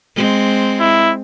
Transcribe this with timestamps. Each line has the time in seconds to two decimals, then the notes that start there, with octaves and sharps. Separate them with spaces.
0.16 G#3 C4
0.80 E4